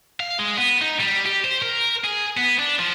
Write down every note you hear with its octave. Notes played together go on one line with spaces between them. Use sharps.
F5
G#3
B3
D#4
G3
G4
C5
A#4
G#4
B3
D4
F3